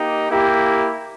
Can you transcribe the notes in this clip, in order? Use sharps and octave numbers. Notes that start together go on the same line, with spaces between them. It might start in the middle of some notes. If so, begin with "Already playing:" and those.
Already playing: A#3 D#4 G4
A#3 E4 G4